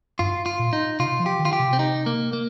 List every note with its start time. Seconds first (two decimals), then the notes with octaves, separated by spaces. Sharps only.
0.19 G2 F4
0.46 F4
0.59 A#2
0.73 D#4
0.99 C3 F4
1.19 F3
1.26 G4
1.39 D#3
1.45 F4
1.53 G4
1.59 C3
1.73 C4
1.79 D#4
2.06 A#3
2.33 A#3